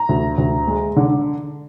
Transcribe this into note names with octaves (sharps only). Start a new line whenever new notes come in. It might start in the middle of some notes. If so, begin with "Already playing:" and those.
Already playing: A#5
D2
D2
G#3
D3